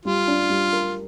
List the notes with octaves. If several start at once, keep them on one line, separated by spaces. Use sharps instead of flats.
G3 F4
D4
G3
A#4